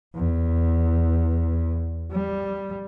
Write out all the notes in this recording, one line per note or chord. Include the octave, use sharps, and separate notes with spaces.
E2
G3